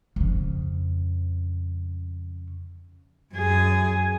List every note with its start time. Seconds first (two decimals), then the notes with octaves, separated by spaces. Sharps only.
0.16 F2 C#3
3.35 F#2 G#4